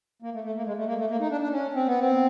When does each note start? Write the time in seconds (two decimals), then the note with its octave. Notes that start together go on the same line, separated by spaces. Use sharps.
0.22 A#3
0.33 A3
0.44 A3
0.55 A#3
0.65 G#3
0.77 A3
0.87 A#3
0.98 A3
1.09 A#3
1.20 D#4
1.30 D4
1.41 D4
1.52 C#4
1.74 C4
1.86 B3
1.99 C4